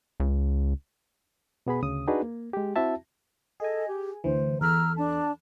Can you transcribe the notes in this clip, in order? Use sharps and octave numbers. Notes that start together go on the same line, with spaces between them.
C#2
B2 B3 G#4 B5
D2 C#3 D#6
D4 D#4 F#4 G#4 B4
A#3
G#3 G4
C4 E4 F#4 E5 A5
G#4 A4 D#5 G#5
G4
D2 E3 C5
E2 A4 A#5 B5 E6 F6
D4 A5